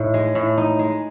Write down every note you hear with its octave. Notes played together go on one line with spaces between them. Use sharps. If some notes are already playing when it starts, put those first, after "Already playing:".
Already playing: A2 D#4
G#3
A2
D#4
G#3